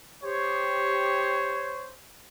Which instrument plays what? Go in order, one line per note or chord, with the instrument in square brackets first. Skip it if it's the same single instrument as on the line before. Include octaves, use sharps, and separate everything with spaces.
[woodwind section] G4 [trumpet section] C5 C#5